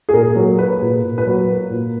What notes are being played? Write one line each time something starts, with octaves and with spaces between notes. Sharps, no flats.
G#4
A#2 A#4
F#3 G#4
A#3 B4
A#2
A#2
B4
F#3
A#3
A#2